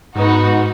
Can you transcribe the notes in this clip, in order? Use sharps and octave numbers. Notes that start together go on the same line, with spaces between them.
G#2 B3 D#4 F#4